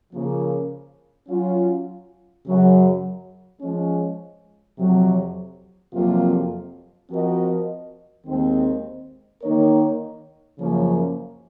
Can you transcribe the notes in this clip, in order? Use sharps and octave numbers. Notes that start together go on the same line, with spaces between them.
C#3 F3 A#3
F#3 C#4 F4
F#2 C#3 F#3
F3 G#3 C#4
F2 C3 F#3
F2 C3 F#3 A#3 F4
F3 C4 F#4 A#4 D#5
D#2 D#3 G#3 C4
D#3 A#3 D#4 A#4 C#5
F#2 C#3 F3 A#3 C#4